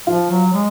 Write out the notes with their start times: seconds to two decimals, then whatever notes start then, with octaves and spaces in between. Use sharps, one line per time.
0.07 F3 F4
0.30 F#3
0.53 G#3